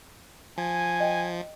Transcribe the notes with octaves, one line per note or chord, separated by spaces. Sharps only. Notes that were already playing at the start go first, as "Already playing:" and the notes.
F3 G#5
D#5 G5